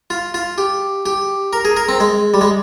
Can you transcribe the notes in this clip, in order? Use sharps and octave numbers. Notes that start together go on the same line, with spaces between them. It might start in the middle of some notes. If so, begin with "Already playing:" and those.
F4
F4
G4
G4
A#4
G#4
A#4
C4
G#3
G3
G#3